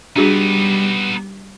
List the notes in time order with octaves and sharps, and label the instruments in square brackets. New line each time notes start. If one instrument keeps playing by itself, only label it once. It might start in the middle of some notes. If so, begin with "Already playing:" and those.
[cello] G3 [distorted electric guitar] B3 D#4 [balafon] D4 F#4 G#4